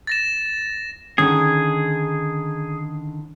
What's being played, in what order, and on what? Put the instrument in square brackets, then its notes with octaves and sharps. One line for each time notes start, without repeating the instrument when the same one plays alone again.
[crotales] A6 A#6 E7
[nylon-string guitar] D3 D#3 C#4 [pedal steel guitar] G#4